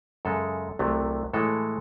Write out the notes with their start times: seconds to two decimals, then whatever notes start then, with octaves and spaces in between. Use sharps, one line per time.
0.25 F#2 C#3 G#3 A4
0.79 C2 C3 F#3 A3
1.33 A2 E3 G#3 A4